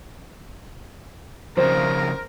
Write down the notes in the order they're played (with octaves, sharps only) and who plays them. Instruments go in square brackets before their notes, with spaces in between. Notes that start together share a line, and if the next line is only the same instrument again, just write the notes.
[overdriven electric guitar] F2 C#3 [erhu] A#4 [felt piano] C5